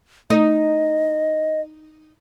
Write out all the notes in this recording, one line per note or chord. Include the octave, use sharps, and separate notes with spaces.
A3 D#4 D#5